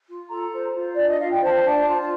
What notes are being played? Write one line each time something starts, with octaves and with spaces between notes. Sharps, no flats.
F4
A4 A#5
C5
F4
D4 D5
D#5
F4 F5
G5
C5 A5
D4 A5
F4